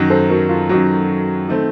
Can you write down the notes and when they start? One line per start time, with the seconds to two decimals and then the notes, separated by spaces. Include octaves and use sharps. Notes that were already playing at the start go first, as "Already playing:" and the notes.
Already playing: F#2 D#3 F#3
0.10 A4 C5
0.29 F#4 A#4
0.49 F4
0.69 F#2 D#3 F#3 F#4
1.48 D#3 A3 C4